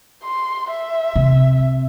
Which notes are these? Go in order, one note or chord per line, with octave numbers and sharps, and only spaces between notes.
C6
E5
C3